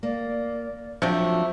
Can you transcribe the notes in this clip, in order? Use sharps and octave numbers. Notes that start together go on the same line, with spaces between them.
A#3 D5
C3 F3 F#3 A3 D4 E5 G5